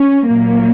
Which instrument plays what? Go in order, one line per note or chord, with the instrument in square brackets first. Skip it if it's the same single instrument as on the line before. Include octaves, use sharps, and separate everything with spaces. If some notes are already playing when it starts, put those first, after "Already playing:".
Already playing: [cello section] C#4
A#2 F#3 A#3